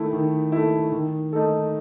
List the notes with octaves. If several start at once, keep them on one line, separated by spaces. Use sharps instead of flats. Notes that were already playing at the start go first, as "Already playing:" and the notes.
Already playing: D#3 A3 E4
D#3
A3 E4
D#3
A3 D#4 A4